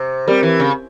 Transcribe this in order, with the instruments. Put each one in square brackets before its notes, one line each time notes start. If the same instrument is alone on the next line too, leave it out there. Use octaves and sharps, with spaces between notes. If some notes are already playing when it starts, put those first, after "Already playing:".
Already playing: [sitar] C3
[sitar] G3 [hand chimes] C4 G4 A#4
[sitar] E3
C#3